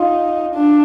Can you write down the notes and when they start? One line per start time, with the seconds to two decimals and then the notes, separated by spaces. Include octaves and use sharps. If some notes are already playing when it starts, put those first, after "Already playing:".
Already playing: D#4 F4
0.55 D4